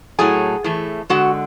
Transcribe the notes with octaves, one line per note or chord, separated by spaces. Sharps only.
A2 F#3 A3 G#4 G#5
A2 E3 A3
D3 G#3 F#4 F#5